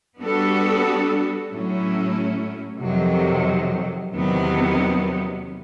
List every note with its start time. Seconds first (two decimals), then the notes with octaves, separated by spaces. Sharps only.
0.21 G3 B3 D4 F#4 A4
1.51 A2 F#3 A3 C#4 E4
2.82 F2 C3 D#3 F#3
4.13 E2 C3 D#3 F#3 B3